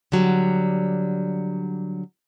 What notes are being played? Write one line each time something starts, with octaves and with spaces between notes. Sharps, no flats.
D3 F#3 G3